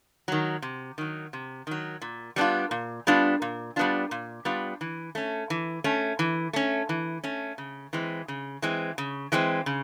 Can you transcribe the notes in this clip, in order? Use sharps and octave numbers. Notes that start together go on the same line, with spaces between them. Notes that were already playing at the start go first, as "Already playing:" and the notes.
D#3 F#3
C3
D#3 F#3
C3
D#3 F#3
A#2
G3 B3 D4 F4
A#2
G3 B3 D4 F4
A#2
G3 B3 D4 F4
A#2
G3 B3 D4 F4
E3
A3 C#4
E3
A3 C#4
E3
A3 C#4
E3
A3 C#4
C#3
E3 G#3 C4
C#3
E3 G#3 C4
C#3
E3 G#3 C4
C#3